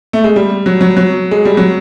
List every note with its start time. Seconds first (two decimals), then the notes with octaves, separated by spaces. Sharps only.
0.13 A3
0.24 G#3
0.36 G3
0.66 F#3
0.81 F#3
0.97 F#3
1.31 G#3
1.45 G3
1.57 F#3